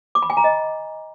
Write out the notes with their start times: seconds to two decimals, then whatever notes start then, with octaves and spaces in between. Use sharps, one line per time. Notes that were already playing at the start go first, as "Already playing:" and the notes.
0.15 D6
0.22 B5
0.30 G#5
0.37 A#5
0.44 D#5